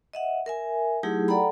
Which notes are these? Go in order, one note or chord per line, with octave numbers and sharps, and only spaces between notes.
D#5 E5 F#5
A#4 E5 G#5
F#3 A3 D#4 E4 G4 G#4
A4 D5 F#5 G5 A#5 B5